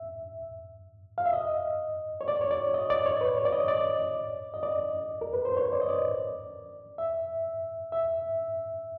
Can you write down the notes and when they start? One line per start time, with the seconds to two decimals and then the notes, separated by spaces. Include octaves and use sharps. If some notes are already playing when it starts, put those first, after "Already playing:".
Already playing: E5
1.18 F5
1.26 E5
1.33 D#5
2.21 C#5
2.28 D5
2.41 C#5
2.51 D5
2.74 D#5
2.90 D5
3.06 C#5
3.21 B4
3.37 C#5
3.45 D5
3.53 D#5
3.68 D5
4.54 D#5
4.63 D5
5.21 A#4
5.33 B4
5.45 C5
5.57 C#5
5.73 D5
5.82 D#5
5.89 D5
6.98 E5
7.92 E5